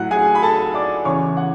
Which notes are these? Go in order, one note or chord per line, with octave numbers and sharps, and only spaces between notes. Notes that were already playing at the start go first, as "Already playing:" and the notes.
Already playing: A2 F#3 F#5 F#6
G#4 G#5
B5
A4 A5
D5 D6
E2 C#3 E3 C#5 C#6
F#5